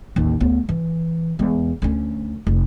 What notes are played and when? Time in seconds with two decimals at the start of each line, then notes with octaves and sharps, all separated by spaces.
0.16 A1 D#2
0.40 D2 B3
0.69 E3
1.39 E2 G#3
1.82 D2 C#4
2.47 F1